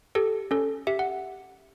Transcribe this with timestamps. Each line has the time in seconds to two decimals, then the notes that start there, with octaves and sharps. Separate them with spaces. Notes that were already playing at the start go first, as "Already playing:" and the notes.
0.15 G4 A4
0.51 C#4 A4
0.87 G4 E5
0.99 F#5